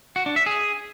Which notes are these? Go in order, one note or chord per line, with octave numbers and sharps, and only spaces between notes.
F#4
D4
E5
G#4